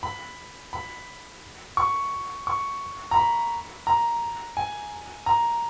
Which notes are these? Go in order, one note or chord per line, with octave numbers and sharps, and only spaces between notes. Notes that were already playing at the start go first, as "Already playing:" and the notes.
B5
B5
C#6
C#6
A#5
B5
A#5
G#5
A#5